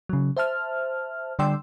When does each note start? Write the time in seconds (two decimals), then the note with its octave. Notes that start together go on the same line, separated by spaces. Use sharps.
0.09 C#3 F#3
0.37 C5 E5 A5 F6
1.39 D3 G3 D5 G5 C6 E6